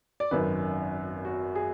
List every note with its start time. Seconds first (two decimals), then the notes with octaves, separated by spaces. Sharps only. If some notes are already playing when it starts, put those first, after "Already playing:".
0.20 D5
0.31 G#1 F#2 D#3 B4
1.25 F#4
1.55 G#4